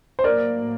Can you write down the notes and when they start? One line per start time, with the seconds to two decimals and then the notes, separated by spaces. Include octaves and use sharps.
0.19 C5
0.24 A2 F#3 A#3 A#4 D5